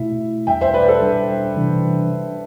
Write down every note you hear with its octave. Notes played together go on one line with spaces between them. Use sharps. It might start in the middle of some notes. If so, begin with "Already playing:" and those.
Already playing: B2 A3 E4 E5
E2 B2 G3 D4 E5 G5
C5 E5
B4 D5
A4 C5
B2 G3 D4
C3 E3 G3 D4